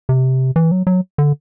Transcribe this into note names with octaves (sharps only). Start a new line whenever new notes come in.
C3
E3
F#3
F#3
D3